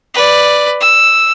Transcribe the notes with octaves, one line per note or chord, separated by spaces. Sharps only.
B4 D5
E6